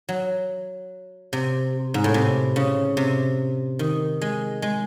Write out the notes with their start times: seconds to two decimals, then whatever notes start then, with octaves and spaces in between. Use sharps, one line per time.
0.09 F#3
1.33 C3
1.94 G#2
2.04 A2
2.14 C3
2.56 C#3
2.97 C3
3.79 D#3
4.21 G#3
4.62 G#3